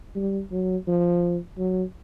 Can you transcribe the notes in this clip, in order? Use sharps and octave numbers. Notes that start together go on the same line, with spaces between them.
G3
F#3
F3
F#3